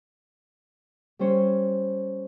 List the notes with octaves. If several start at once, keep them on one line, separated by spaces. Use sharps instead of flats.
G3 C#4 C5 C#5